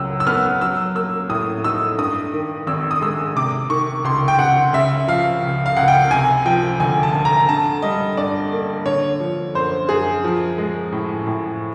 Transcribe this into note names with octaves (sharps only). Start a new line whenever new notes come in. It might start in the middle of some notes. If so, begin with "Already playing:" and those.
Already playing: C#2 F#3 E6
E6
B3 F6
F#3 E6
A#3 E6
A2 D#6
D#4 E6
G2 D#6
D#3
G#1 E6
D#6
G#3 E6
C3 D6
D#3 C#6
C#2 C6
G5
C#2 F#5
C#3 E5
F3 F5
C#2
F5
C#2 F#5
G5
C3 G#5
F3 G5
D2 G#5
A5
D2
A#5
D3 A5
G3 D#5
G2 D5
A#3
D3 C#5
F3
F#2 C5
F#2 G#4
F3
G#3
A2
A2